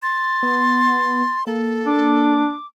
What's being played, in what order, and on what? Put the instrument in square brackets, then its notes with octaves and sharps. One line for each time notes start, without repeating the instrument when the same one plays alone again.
[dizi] C6 [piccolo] A6
[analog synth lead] B3
[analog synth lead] A#3 [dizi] A4
[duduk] D4 [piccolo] D6